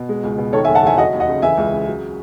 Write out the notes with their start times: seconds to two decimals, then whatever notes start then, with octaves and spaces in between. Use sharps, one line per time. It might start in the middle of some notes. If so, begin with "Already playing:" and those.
Already playing: B2
0.09 G#3
0.23 C#2
0.38 B2
0.52 D#3 A4 C#5
0.65 E5 G#5
0.68 F#1
0.75 F#5 A5
0.83 E2 E5 G#5
0.97 F#3 D#5 F#5
1.13 D#2
1.20 D#5 F#5
1.28 C#3
1.42 E3 E5 G#5
1.57 C#2
1.72 C#3
1.87 F#3